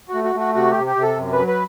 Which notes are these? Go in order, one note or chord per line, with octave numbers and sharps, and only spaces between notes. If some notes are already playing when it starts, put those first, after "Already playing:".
F#4
A3
F#4
A3 F#4
C3 F#4
C3 G4
G4
C3
A4
F#2
B4
F#3
B4